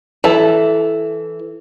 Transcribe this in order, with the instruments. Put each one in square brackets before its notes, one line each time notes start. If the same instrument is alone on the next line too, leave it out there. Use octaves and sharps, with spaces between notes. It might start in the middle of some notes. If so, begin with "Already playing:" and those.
[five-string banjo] E3 E4 A4